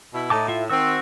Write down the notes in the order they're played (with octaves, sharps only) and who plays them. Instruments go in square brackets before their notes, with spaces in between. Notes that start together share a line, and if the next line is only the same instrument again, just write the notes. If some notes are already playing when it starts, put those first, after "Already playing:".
[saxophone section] B2 E4
[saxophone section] A2 [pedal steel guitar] D#4 A5 D6
[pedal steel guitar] F4 E5
[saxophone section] D#3 C4 [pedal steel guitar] F#4 E6